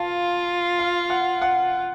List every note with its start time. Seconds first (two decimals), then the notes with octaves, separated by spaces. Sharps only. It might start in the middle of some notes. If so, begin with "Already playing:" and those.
Already playing: F4 F5 A5
0.79 F5
1.10 F#5
1.42 F#5